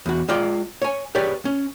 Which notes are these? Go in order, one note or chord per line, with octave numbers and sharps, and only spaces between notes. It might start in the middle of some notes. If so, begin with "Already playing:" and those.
E2 F#4
G#3 F4 D5 G5
C#5 G#5
G4 G#4 B4 C#5 D5
C#4